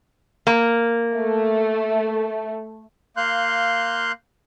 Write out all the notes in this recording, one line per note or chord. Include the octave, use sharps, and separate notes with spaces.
A#3
A3
A#3 F5 C6 F#6 G6